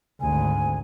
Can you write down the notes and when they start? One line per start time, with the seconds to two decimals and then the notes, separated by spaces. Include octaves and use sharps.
0.21 G#1 D2 G#5